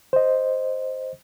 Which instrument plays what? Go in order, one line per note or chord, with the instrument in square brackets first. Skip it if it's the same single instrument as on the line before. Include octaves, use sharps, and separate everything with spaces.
[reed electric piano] C5 D#5